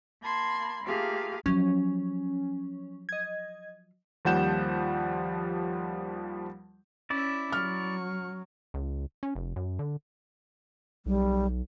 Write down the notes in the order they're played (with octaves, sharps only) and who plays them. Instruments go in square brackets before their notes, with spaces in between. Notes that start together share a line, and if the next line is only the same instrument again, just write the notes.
[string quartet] A#3 A5 B5 C6 G#6
A3 A#3 F4 G4 G#4 F5
[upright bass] F3 F#3 [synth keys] C#4
[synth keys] D#5 G#6
[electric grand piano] D#2 F3 G3 F#5 G6 E7
[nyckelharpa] C#4 E5 [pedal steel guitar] E4 D5
[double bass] F#3 [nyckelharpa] C#6 [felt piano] F6
[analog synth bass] C#2
C#4
F1
F#2
D3
[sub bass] B1 [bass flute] G3